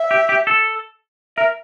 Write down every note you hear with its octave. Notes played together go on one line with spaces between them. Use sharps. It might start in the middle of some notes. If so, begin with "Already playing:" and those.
Already playing: E5
G4
G4
A4
A#4 E5